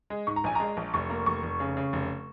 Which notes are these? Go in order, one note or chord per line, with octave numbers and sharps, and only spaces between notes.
G#3
G#2 C#6
A#5
A#1 G#5
G#3 A#5
A#1
F1 C#6
A#3
F1 C#6
F1
C#3
C#3
F1